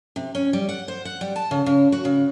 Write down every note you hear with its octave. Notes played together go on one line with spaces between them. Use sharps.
C3
C#4
G3
F#5
C5
F#5
G3
A5
C#3
C#3
F#4
C#3